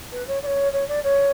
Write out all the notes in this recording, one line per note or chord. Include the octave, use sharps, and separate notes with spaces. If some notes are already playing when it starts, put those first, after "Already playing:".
B4
C#5
D5
C#5
C#5
D5
C#5